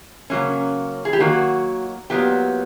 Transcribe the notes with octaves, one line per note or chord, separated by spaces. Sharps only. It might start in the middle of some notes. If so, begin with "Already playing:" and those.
C#3 F#3 A#3 C#4
G#4
G4
D#3 F#3 A#3 F#4
A#2 F#3 B3 G4